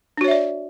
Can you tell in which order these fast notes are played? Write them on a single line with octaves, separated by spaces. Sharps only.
D4 F#4 C#5 E5 D5